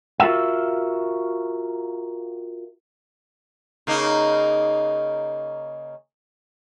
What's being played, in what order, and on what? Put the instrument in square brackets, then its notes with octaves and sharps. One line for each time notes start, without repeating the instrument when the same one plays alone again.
[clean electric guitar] F4 F#4 A#4 E5 F5
[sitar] C#3 A#3 D#4